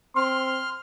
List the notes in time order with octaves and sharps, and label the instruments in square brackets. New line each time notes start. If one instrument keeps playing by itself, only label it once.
[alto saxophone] C4 [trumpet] C6 [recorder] F6